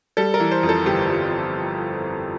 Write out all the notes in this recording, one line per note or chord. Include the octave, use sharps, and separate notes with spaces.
G3 A4
A#4
E3
C5
F2
A4
G1 G4
G3